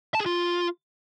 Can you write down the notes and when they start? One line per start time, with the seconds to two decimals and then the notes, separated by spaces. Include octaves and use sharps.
0.15 A5
0.20 G#4
0.26 F4